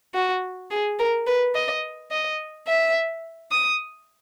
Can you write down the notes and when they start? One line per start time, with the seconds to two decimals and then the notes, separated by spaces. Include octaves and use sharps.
0.14 F#4
0.71 G#4
0.99 A#4
1.27 B4
1.55 D#5
2.11 D#5
2.68 E5
3.51 D#6